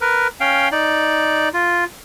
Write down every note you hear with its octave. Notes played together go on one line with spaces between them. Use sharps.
A#4 B4
C#4 F5 G5
D#4 D5
F4